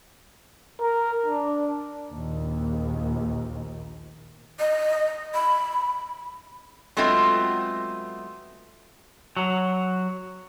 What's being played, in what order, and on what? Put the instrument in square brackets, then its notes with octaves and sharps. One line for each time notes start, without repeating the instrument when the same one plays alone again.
[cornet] A#4
D4
[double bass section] A#1 D#2
[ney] D#5
B5
[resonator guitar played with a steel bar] F#3 G#3 A3 B3 C4 F4
[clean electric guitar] F#3